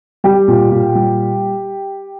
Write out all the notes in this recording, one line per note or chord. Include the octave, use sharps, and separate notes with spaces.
G3 G4
A#2
A#2
G3